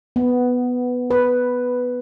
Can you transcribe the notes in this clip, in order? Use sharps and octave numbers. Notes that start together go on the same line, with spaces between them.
B3
B4